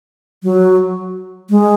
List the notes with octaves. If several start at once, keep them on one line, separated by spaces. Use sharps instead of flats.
F#3
G#3